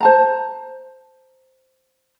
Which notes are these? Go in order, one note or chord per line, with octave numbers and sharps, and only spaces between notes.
C5 A5 A#5